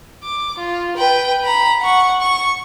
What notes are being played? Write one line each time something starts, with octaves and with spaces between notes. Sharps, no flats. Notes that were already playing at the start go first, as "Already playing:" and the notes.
D6
F4
B4 G5
A#5 B5
F#5 C#6
C#6